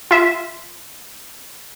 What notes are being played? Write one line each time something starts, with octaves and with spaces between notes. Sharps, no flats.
F4 E5